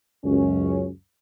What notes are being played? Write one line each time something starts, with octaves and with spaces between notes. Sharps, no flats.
C#2 F#2 C#4